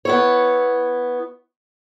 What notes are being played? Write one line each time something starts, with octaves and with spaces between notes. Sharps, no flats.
B3 E4 C#5